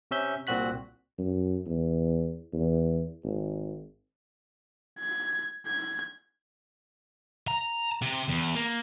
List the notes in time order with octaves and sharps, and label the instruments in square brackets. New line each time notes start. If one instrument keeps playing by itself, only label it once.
[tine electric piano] C3 C#4 E5 G6
C2 A#2 C4 F#4 F#6 B6
[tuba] F#2
E2
E2
G#1
[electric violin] G#6
G#6
[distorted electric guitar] A#5
C3
E2
A#3